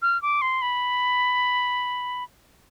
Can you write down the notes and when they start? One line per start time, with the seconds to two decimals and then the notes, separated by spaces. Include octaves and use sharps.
0.02 F6
0.22 D6
0.42 C6
0.62 B5